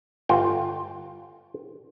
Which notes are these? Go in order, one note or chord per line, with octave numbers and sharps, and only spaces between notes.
G1 F4 G5